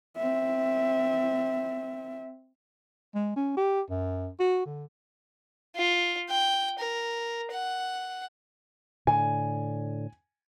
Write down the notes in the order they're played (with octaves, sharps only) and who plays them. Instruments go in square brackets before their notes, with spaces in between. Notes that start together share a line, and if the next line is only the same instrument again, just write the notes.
[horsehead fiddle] C4 E5
[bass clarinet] G#3
C#4
G4
F#2
F#4
D3
[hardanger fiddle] F4
G5
A#4
F#5
[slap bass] A2 D3 [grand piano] G#5